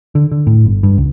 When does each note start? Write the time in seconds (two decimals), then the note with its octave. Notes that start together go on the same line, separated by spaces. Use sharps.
0.15 D3
0.32 D3
0.47 A2
0.65 G1
0.83 G2
0.98 C#2